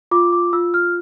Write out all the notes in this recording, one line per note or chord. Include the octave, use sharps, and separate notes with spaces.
F4 D6
D6
F4 E6
F6